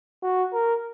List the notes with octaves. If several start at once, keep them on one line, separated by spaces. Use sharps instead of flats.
F#4
A#4